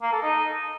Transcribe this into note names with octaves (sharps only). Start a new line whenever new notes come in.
A#3
A4
D#4